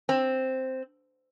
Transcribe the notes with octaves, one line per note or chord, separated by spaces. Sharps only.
C4